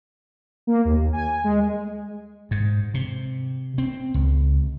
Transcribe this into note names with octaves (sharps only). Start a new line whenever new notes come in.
A#3
D#2
G#5
G#3
G#2
C3
C4
C#2